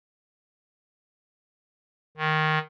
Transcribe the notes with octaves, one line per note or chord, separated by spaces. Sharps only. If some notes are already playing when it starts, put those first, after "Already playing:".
D#3